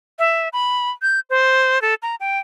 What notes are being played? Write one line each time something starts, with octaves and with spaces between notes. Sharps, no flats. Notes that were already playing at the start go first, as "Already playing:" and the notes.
E5
B5
G6
C5
A4
A#5
G5